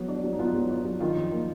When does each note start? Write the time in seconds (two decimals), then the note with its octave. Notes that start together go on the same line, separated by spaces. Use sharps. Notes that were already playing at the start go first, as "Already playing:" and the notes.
Already playing: F#3 B3
0.08 D4
0.24 F#3
0.32 D#4
0.39 B3 F4
0.54 F#3
0.70 D4
0.85 F#3
1.00 D#3 F4
1.16 F2
1.32 A#3